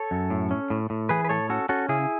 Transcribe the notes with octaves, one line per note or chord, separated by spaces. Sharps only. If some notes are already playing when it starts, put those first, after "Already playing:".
Already playing: A4 C#5
F#2
A2
C#4
A2
A2
E3 G#4 B4
B4
A2 A4 C#5
C#4 F#4 A4
C#4 F#4 A4
C#3 E4 G#4